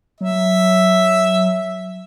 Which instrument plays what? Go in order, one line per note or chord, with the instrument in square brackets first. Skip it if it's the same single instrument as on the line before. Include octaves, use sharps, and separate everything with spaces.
[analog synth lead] F#3 [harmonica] E5